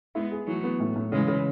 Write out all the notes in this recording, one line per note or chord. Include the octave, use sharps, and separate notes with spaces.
G#3 B3 E4
G#4
E3 F#3 A3
B3
A2
A2
C#3 E3 G#3
C#3